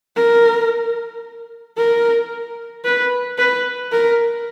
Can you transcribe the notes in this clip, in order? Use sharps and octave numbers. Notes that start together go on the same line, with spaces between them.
A#4
A#4
B4
B4
A#4